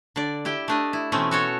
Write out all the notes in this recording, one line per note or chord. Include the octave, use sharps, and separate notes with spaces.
D3 D5
E4 G4 G5
A3 D4 D#5
E4
B2 E3 A3 C4 C#4
F#4 A4 C#5